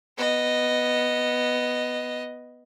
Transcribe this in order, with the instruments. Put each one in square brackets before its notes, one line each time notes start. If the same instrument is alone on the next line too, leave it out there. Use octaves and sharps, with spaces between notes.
[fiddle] B3 D#5